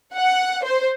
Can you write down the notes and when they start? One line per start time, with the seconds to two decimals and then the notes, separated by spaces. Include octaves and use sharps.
0.14 F#5
0.64 C5